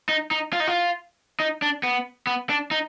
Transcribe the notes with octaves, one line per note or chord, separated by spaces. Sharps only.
D#4
D#4
F4
D#4
F4
D#4
D4
B3
B3
D4
D#4